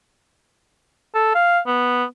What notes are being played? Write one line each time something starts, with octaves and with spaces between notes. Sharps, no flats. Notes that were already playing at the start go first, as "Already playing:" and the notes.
A4
F5
B3